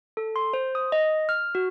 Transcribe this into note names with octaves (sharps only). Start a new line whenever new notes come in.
A4
C6
C5
D#6
D#5
F6
F#4